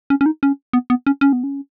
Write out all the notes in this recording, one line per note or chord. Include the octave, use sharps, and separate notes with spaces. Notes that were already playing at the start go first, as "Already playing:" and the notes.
C#4
C#4
D#4
C#4
B3
B3
C#4
C#4
B3
C#4